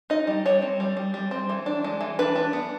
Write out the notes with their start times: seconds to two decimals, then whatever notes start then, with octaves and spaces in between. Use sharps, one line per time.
0.10 D#4 D#5
0.27 G3
0.46 G3 C#5
0.62 C4
0.80 G3
0.97 G3
1.14 G3
1.31 C4
1.50 E3
1.66 D4
1.84 G#3
2.01 E3
2.19 D4 B4
2.36 D4
2.53 B3